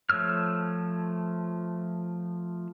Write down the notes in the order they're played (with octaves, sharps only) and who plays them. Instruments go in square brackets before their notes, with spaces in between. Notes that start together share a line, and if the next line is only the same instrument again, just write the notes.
[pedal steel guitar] F3 A3 C#5 E6 F6